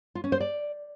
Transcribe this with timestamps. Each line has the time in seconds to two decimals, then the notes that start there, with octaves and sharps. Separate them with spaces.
0.15 F4
0.24 C#4
0.32 C5
0.40 D5